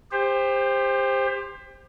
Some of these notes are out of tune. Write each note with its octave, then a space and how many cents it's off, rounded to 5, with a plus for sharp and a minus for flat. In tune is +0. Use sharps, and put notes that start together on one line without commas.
G4 +30 C5 +5